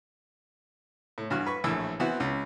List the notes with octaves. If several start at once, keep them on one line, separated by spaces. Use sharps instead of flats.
A2
G2 E3 F#4 F6
B4 C#6
A#1 A2 E3 A5 E6
E3 B3 C4 E4 F#4
C#2